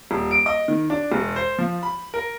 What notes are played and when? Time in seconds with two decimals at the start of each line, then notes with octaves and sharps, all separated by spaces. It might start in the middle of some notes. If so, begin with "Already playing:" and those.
0.11 D#1
0.31 D7
0.46 D#5
0.68 D#3
0.90 D4
1.12 E1
1.36 C5
1.58 F3
1.83 B5
2.14 A#4